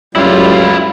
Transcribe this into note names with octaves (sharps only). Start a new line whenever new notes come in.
C#2 F#2 A2 G3 E4 F4